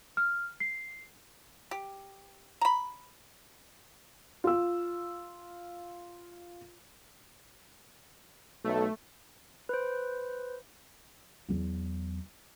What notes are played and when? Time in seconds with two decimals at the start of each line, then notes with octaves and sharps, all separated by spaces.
0.17 F6
0.60 C7
1.71 G4
2.61 A#5 B5
4.44 F4 E6
8.64 B1 A3
9.69 B4 C5
11.49 E2 F#3